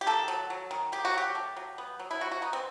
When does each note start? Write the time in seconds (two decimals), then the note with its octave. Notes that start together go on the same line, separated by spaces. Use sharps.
0.01 G4
0.07 D#3 A4
0.28 F#3
0.50 F#3
0.71 D#3
0.92 D#3 G4
1.05 F#4
1.14 F#3 G4
1.35 A3
1.56 F#3
1.78 B3
2.00 F#3
2.11 E4
2.21 C3 F#4
2.31 F#4
2.42 B3 D#4
2.53 C4